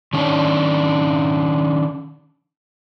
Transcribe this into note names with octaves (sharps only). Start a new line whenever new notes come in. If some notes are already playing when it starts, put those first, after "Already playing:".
D#3 C#4 D4